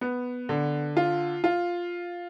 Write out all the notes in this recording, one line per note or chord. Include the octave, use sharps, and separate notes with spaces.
B3
D3
F4
F4